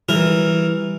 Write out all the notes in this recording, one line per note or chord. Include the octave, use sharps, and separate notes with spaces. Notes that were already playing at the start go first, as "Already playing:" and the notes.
E3 G3 A#4